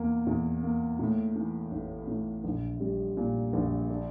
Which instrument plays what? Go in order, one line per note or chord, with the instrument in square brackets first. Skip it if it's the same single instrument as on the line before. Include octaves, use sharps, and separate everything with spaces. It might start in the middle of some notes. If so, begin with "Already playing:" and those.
Already playing: [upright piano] E2 A#3
E2
A#3
A2
E3
A1
A2
A#1
G3
A#2
A#1
D4